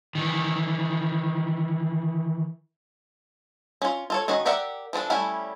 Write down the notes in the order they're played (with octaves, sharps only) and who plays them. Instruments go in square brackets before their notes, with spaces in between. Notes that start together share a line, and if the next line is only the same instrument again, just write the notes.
[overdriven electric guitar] D#3 E3
[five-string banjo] C#4 F4
F4 A4 C#5
D#3 C#4 F#4 D#5
G4 A#4 D5 E5 F#5
E3 F3 D4 A4
G3 A3 C#4 E4 G#5